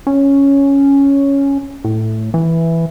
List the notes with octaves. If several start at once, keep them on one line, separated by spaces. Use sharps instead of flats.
C#4
A2
E3